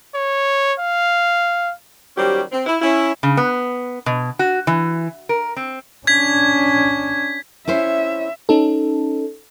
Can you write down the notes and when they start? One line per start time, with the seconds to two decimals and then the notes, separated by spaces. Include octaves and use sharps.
0.15 C#5
0.79 F5
2.16 D#3 F#3 G3 C#4 G4 C5
2.52 C4
2.66 E4
2.82 C#4 E4
3.23 C#3
3.37 B3
4.06 B2
4.39 F#4
4.67 E3
5.29 A#4
5.56 C4
6.07 C#4 D4 G#6 B6
7.68 C#4 E4 C5 E5
8.49 C#4 D#4 A4